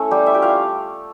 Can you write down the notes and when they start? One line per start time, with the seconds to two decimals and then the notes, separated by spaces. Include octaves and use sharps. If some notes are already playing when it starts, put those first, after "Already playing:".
Already playing: A3 C#4 E4 A4
0.11 G3 G4
0.26 E4 E5
0.34 G4 G5
0.42 F4 F5